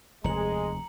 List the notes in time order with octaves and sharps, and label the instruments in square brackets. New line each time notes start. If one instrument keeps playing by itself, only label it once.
[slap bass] F1 D#2 [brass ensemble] G#3 [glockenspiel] A#5 C#7 F#7